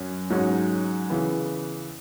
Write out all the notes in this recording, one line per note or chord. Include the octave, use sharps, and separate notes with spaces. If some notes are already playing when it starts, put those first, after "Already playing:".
Already playing: F#2 F#3 C#4
G#2 F#3 C#4
C#3 E3 B3